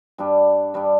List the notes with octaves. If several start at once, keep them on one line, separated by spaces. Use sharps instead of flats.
G2 G3 D4
G2 G3 D4